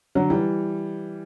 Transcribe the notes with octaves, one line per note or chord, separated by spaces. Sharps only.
D3 F#3
E3 G3